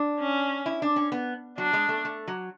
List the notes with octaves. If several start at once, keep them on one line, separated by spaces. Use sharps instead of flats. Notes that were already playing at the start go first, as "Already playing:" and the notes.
Already playing: D4
C#4
E4
D4
C#4
B3
F#3 D4
G#3
A3
A3
F#3